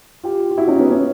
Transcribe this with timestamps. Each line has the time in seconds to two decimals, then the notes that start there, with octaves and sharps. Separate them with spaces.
0.24 F4 G4
0.51 F4
0.57 E4 F#4
0.67 C#4 D#4
0.79 B3 C#4
0.90 B3 C#4